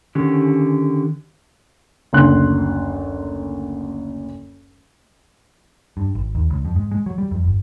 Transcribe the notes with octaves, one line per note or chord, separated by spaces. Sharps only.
D3 D#3 C#4 G4
F#1 D2 C6 F#6
G2
G#1
D#2
C#2
F2
G#2
G#3
F#3
G3
F2
G1